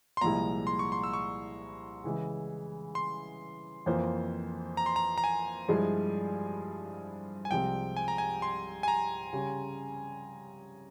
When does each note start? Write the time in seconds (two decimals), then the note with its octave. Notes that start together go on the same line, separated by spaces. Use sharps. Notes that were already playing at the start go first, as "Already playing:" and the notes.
0.17 C6
0.21 C2 A#2 F3 G#3 E4 A#5
0.67 C6
0.79 C#6
0.92 C6
1.04 E6
1.13 C#6
2.04 C#3 E3 G#3 E4
2.95 C6
3.86 F2 E3 A#3 F4 C5
4.77 A#5
4.86 C6
4.96 A#5
5.18 A#5
5.24 G#5
5.68 G2 F3 G#3 E4 G#4
7.45 G#5
7.51 C2 C3 F3 G#3 C4 G5
7.97 G#5
8.08 A#5
8.18 G#5
8.42 C6
8.83 G#5
8.88 A#5
9.33 C#3 G3 C#4